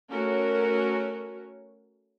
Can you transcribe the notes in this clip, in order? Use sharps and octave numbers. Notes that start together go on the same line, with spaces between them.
A3 C#4 F#4 A#4 C#5